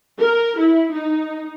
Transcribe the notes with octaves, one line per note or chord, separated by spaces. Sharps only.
A#4
E4
D#4